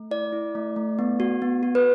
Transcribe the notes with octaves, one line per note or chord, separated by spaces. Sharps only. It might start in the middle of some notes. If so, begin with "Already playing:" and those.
Already playing: A3
E4 D5
E4
A3
A3
B3
F#4
B3
F#4
B4